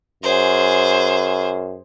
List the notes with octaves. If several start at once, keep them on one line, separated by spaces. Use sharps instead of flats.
F#2 G#4 C5